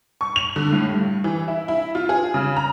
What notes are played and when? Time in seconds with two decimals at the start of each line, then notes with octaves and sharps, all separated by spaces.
0.21 C#6
0.36 F7
0.56 D3
0.72 A2
0.90 G2
1.24 E3
1.48 E4
1.68 E4
1.95 F4
2.09 G#4
2.34 C#3
2.56 A#5